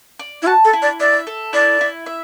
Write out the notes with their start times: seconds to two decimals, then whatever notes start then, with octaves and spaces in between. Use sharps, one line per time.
0.19 D5
0.42 E4
0.47 F#4 A5
0.65 A4
0.73 E4
0.82 D5
1.00 D5 E5
1.27 A4
1.53 E4 D5
1.81 E4
2.06 E5